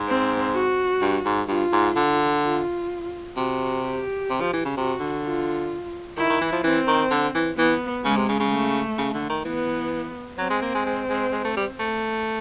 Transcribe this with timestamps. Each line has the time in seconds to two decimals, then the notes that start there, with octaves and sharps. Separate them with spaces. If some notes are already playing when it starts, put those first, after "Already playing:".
Already playing: G#2
0.08 C4
0.55 F#4
1.01 G2
1.25 G#2
1.48 G2 F4
1.73 G#2
1.96 D3
2.42 F4
3.36 C3 F#4
3.83 G4
4.30 C3
4.41 F3
4.53 E3
4.65 C#3
4.77 C3 F#4
5.00 D3
5.24 F4
6.17 D#3 E4
6.30 D#3
6.41 E3
6.52 F3
6.64 E3 C4
6.87 D#3
7.11 D3
7.35 E3
7.58 E3 B3
8.04 C#3 G#3
8.16 C3
8.29 C#3
8.40 C#3
8.51 A3
8.98 C#3
9.14 D3
9.29 D#3
9.45 E3 B3
10.38 F#3 C4
10.50 G#3
10.62 A#3
10.75 G#3
10.86 G#3
11.09 G#3
11.32 G#3
11.45 A3
11.57 G3
11.79 A3